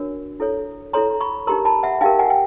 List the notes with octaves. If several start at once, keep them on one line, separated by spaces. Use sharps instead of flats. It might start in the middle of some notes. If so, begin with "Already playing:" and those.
Already playing: D4 F#4 A#4 C#5
E4 A4 C#5
E4 A4 C#5 A#5 C6
B5 C#6
D#4 G4 A#4 A#5 C6
A5 B5
E5 F#5
D#4 G4 A#4 F5 G5
F#5 G#5
G5